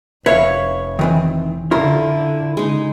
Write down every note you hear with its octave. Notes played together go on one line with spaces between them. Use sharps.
F1 B4 C#5 E5 F5
D#3 E3 C4
D3 E4 F4 A#4
C#3 G#3 D#4